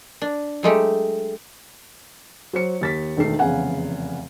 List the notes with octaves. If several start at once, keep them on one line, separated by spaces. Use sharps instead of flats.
D4
F#3 G#3 A3 G4
F#3 C5 C#7
D#2 A6 B6
E1 D#3 A3 C7
F1 E2 C#3 F5 F#5 G#5